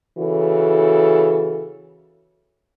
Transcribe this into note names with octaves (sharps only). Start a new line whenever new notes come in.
C#3 E3 F#4 A4